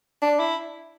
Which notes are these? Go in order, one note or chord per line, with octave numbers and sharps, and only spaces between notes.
D4
E4